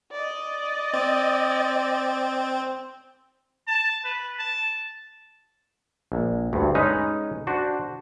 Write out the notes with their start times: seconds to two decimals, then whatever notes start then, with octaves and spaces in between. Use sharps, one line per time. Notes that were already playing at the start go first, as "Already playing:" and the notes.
0.12 D5 D#5
0.94 C4
3.67 A5
4.04 B4
4.39 A5
6.12 A#1
6.53 D2 G2
6.75 G#3 C#4 D#4 B4 C#5
7.47 D4 F#4 C5